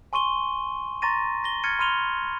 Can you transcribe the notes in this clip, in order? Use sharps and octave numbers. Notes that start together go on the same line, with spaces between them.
G#5 C6 C#6 D#7 G7
A#5 C6 C#6 A6 A#6 D#7
A#6 G7
F6 G#6 A6 C#7 D#7
B5 C6 F6 D#7 F7 G7